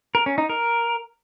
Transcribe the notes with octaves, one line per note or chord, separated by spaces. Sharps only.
A#4
C#4
D#4
A#4